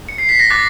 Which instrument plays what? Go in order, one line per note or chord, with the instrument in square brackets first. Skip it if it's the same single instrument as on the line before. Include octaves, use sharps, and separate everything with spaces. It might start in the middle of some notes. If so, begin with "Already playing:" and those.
[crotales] C#7
C7
B6
A#6
D6 F#6 A6